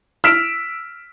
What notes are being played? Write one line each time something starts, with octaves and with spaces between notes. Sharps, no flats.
E6 F6 B6 D7 E7